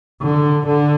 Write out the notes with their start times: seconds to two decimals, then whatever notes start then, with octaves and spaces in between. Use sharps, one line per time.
0.22 D3
0.67 D3